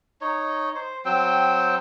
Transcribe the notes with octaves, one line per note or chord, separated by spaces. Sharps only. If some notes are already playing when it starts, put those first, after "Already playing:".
D#4 C#5
C5
F#3 C4 G5 E6